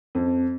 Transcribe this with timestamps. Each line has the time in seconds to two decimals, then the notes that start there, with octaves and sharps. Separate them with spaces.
0.15 F2